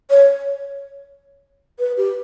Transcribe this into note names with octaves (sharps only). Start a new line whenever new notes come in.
C#5
B4
G4